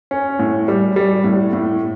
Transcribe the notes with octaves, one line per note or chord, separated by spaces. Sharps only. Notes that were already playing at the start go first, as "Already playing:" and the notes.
C#4
A2
G3
G3
A2
A2